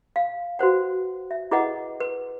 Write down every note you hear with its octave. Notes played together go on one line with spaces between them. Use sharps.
F5
F#4 B4 C5 F#5
E5
E4 G#4 B4 D#5 F#5
B4